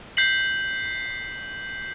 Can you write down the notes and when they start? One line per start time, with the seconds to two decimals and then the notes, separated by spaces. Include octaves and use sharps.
0.17 G6 B6 C7 F#7